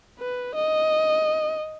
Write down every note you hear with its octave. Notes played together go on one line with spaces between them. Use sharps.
B4
D#5